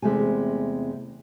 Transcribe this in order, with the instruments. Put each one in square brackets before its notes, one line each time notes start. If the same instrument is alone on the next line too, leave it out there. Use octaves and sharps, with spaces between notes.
[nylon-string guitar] E2 C3 G#3 A3 G#5